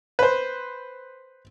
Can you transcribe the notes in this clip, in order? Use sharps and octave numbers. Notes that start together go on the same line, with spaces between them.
B4 C5